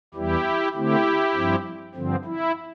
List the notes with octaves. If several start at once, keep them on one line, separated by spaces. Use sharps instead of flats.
E2 E3 G3 E4 G4
D3 A3 C4 E4 G4
G2 F3 C4
G2 D3 F3 C4
E4